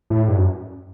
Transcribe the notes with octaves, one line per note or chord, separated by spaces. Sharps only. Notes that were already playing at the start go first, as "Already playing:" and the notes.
A2
G2
F#2